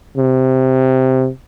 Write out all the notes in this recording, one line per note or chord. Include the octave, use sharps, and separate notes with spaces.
C3